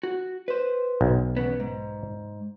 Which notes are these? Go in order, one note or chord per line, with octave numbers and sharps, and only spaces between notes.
F#4
B4 C5
B1
E2 C#3 B3
G#2